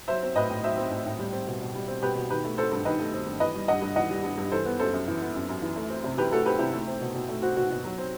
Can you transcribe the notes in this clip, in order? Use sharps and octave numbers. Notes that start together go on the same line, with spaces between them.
F#3 C5 E5
C4
A2 B4 D#5
A2
F#3 C5 E5
C4
A2
A2
G3
C4
B2
B2
G3
C4
B2 G4 B4
B2
D#3 G4 B4
A3
C4 A4 C5
G2
D#3 B4 D#5
A3
C4
G2
E3 B4 D#5
G3
G2 D#5 F#5
G2
E3 D#5 F#5
G3
G2
G2
E3 A4 C5
B3
F#2 A4 C5
F#2
E3
B3
F#2
F#2
E3
A3
C4
C3
E3 G4 B4
A3 F#4 A4
C4 G4 B4
C3 E4 G4
A3
C4
B2
B2
A3
C4 F#4
B2 F#4
B2 F#4
F#3
C4